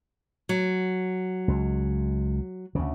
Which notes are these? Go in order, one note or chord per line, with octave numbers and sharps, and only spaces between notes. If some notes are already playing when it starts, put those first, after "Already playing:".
F#3
C#2
D2 C#3